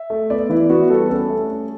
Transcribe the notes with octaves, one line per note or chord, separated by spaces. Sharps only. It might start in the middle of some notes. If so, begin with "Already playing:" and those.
Already playing: E5
A3
B3 D5
E3 E4
B3 F#4
G3 A4
C#4 A4
A3
C#4